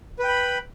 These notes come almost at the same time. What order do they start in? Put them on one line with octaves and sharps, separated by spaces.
B4 G5 B5